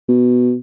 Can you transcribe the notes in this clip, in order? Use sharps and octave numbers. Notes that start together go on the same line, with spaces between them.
B2